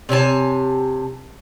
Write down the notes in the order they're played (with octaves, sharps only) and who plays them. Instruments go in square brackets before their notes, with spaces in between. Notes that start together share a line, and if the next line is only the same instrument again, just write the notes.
[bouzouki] C3 C#5 G#5 A5